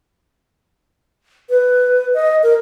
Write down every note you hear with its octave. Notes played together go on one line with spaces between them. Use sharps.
B4
D#5
A#4